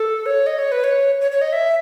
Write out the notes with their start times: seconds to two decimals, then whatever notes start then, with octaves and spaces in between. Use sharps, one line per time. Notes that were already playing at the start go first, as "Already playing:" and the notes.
Already playing: A4
0.26 C#5
0.47 D#5
0.59 C#5
0.72 B4
0.84 C#5
1.21 C#5
1.32 C#5
1.41 D#5
1.53 E5